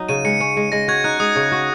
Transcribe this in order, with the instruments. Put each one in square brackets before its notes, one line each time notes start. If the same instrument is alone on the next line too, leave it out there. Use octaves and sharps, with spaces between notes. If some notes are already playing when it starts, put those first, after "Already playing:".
Already playing: [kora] F#3 D#4
[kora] C#3 [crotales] D#7
[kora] G#3 [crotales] C#7
[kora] C#4
G#3
[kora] G#3 [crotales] A#6
[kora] F#4 [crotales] G#6
[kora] D#4 [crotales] F#6
[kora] G#3 [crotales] D#6
[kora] C#3
F#4